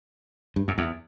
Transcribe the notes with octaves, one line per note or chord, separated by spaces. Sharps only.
G2
F#2
E2